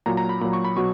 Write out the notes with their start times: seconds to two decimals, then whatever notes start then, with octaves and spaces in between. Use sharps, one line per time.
0.06 A#2 F#3 A#5
0.17 A#5
0.29 B5
0.41 A#2 B5
0.44 F#3
0.53 C#6
0.64 B5
0.76 B2 F#3 C#6